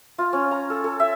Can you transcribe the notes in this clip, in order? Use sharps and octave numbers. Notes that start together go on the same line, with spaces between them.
F4
C#4
A#5
A4
A4
E5